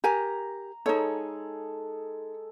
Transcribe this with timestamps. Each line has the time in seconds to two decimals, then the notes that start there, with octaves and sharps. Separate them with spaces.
0.04 G4 A#4 G#5 A#5
0.86 G#3 D#4 A4 C#5 G#5